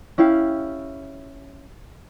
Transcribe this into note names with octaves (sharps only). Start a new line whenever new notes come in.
C#4 E4 G4 F5